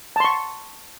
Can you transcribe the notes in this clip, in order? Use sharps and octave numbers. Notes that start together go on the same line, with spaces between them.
A5 C6 C#6